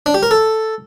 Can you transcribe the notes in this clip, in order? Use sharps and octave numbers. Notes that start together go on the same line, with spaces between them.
D4
G4
A#4
A4